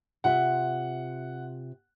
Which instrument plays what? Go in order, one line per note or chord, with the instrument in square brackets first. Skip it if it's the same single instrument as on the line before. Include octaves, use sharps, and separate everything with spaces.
[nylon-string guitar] C3 F4 E5 [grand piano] F#5